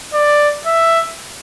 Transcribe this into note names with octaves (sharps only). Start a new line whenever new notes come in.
D5
E5